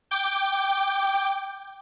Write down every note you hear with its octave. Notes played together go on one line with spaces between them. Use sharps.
G5 D6 G6